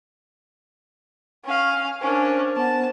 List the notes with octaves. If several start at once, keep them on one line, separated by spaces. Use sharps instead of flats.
C#4 F5
C#4 D4 A#4 C5
B3 C5 F#5 A5